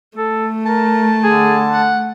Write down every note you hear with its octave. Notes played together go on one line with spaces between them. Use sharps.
A3 A4
A#4 A5
D3 G#4
F#5